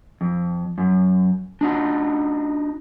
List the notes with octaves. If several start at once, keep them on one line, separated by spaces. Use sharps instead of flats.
F2
F#2
D4 D#4 F#4